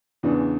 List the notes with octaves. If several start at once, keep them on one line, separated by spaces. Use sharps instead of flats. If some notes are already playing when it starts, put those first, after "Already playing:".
E2 C#3 E3 B3 D4